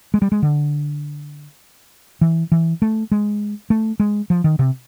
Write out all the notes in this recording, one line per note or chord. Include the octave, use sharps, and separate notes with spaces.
G#3
G3
G#3
D3
E3
E3
A3
G#3
A3
G#3
F3
D#3
C3